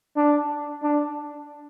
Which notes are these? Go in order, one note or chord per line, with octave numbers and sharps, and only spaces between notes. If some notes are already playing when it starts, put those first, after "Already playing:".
D4
D4